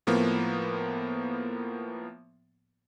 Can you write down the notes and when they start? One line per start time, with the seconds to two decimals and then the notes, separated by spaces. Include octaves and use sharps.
0.07 A2 F3 A#3 B3